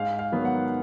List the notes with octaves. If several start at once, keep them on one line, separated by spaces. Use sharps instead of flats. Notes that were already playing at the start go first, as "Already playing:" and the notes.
Already playing: G#2 F5
F5
D#3 F#3 B3
F#5